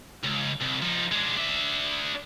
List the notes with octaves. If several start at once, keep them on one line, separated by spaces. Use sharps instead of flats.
C#2
C2
F3 D#4
G#3 D4
D4 E5